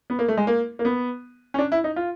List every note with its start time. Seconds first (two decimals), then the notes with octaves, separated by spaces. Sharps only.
0.10 B3
0.19 A#3
0.28 A3
0.37 G#3
0.47 A#3
0.79 A#3
0.85 B3
1.54 C#4
1.59 D4
1.72 E4
1.84 D#4
1.96 F4